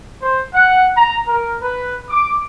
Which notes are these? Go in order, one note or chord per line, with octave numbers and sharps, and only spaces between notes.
C5
F#5
A#5
A#4
B4
D6